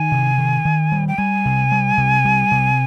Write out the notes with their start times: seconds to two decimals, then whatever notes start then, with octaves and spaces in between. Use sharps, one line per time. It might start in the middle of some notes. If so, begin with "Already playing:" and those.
Already playing: D#3 G#5
0.12 C3
0.38 D#3
0.65 D#3
0.92 G3
1.08 G5
1.18 G3 G#5
1.46 C3
1.72 G3
1.98 C3
2.25 G3
2.52 C3